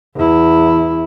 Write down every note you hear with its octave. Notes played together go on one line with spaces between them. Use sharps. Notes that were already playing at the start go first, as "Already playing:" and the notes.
E2 E4